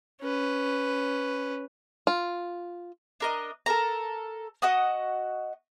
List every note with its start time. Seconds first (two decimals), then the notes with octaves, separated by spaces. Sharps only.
0.22 C#4 B4
2.07 F4
3.20 D4 A#4 D#5
3.66 A4 A#4 A#5
4.62 F#4 D#5 F#5 D#6